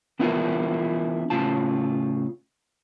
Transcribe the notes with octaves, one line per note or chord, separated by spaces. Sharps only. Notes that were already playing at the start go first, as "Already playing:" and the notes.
E3 B3 D4 E4 F4 A#4
A2 C#3 F4 A5